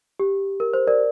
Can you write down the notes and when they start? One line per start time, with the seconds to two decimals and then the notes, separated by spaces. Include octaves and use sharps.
0.20 G4
0.60 A#4
0.74 C5
0.87 A#4 D5